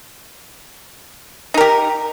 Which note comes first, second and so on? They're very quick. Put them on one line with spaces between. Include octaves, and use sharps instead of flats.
D#4 A#4 G4